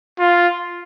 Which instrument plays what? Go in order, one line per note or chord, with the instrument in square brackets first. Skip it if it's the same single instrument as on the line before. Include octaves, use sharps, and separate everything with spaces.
[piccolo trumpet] F4